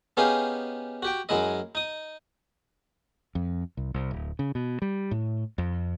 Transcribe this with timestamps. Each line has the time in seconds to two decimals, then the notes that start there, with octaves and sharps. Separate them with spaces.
0.17 B3 C#4 D#4 G4 G#4 F5
1.02 F#4 G4 G5
1.29 F#2 F#3 G#3 E4 D#5
1.75 D#4 D#6
3.35 F2
3.77 C2
3.94 C2
4.11 D1
4.39 C#3
4.55 B2
4.82 G3
5.11 A2
5.58 F2